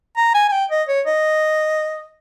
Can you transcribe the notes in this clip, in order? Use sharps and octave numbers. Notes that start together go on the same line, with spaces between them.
A#5
G#5
G#5
G5
D#5
C#5
D#5